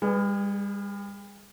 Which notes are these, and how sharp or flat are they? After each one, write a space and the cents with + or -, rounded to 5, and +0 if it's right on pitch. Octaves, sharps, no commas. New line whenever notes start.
G3 +40 G#4 +0 B4 +0